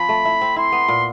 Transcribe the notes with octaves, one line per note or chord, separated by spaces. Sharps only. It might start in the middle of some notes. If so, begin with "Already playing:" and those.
Already playing: F3 C4 B5
A3
E4
C4
E4 C6
B3
A#2